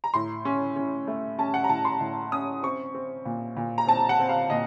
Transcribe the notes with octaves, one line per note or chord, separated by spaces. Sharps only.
A#5
A2 C6
C#4
C#4
A3
C#4 A5
F#5
A#5
A2 A5
C6
A2
C#4 D#6
C4 C#6
C4
A#2
A#2
A#5
C4 A5
F#5
C4
F5
A#2 D#5